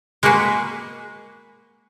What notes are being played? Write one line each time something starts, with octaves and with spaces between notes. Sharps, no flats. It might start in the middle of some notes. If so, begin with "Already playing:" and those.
G#3 A#3 F#4 G#4 B4